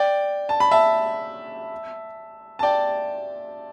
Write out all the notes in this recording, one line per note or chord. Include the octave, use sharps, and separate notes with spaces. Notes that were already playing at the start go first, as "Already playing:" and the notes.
Already playing: D5 G5
A5
B5
E5 A5
A5
D5 G5